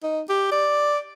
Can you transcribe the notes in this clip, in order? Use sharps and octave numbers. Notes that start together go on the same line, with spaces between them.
D#4
G4
D5